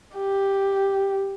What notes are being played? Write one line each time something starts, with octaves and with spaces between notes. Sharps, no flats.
G4